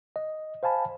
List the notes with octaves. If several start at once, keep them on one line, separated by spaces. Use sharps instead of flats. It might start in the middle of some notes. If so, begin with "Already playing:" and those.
D#5
C5 F5 G#5 A5 B5